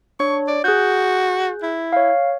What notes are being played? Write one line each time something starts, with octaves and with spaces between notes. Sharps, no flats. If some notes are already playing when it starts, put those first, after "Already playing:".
D4 C#5 C#6
D5
F#4 G#4 F#6 G6
E4
C#5 F5